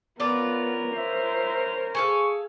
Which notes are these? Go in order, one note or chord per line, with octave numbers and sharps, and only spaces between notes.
E3 B3 C#4 F4 A#4 D5
C5 E5
G#4 A4 F5 C#6